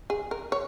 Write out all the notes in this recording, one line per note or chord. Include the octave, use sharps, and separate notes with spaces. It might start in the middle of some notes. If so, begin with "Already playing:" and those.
G#4
A#4
C#5